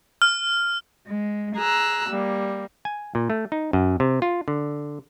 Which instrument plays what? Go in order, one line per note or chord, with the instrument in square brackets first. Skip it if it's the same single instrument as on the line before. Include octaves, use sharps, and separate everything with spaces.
[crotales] F6
[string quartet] G#3
G#4 A#5 E6 F#6
G3 A#3
[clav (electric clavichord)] G#5
A#2
A3
D#4
F#2
C3
F4
D3